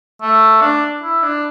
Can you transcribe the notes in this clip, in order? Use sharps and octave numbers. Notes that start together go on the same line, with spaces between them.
A3
D4
E4
D4